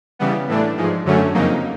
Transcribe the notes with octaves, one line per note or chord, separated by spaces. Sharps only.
C#3 E3 G3 B3
A2 E3 A3 D4
G#2 F3 G#3
F#2 D3 F#3 A3 C#4
F2 C#3 F#3 A#3 D#4